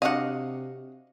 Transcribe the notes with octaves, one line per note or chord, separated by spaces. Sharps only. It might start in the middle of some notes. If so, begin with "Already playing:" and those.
C3 D4 F#4 D#5 F5 F#5